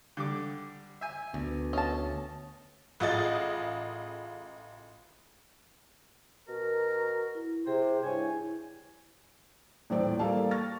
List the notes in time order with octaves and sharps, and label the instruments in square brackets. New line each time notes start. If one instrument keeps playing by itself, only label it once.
[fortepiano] D3 G3 D6
E5 G#5
[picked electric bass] D2 [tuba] B3
[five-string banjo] C#4 A5 [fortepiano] D#5
[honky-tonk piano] A1 F4 G#4 D#5 A6
[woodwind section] B2 F#4 A#4
[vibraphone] E4
[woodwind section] C3 C5 [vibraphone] G#4 G5
[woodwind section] G2 C#5 G#5 [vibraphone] E4
[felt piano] D#1 A2 E3 C4 D5
G3 A#3 A4 F5 A5
C#6 F6 A6 A#6